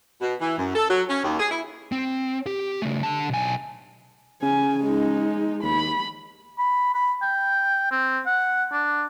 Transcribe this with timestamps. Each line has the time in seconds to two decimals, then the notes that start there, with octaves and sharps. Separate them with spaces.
0.21 B2
0.41 E3
0.58 F#2
0.75 A4
0.89 F#3
1.09 C#4
1.24 D#2
1.40 G#4
1.51 E4
1.92 C4
2.46 G4
2.82 C#3 A3
3.03 D3 A5
3.30 B1 G#5
4.43 C#3 G#5
4.84 G#3 D#4
5.63 D#2 B5
6.58 B5
6.94 B5
7.22 G5
7.91 C4
8.26 F#5
8.72 D4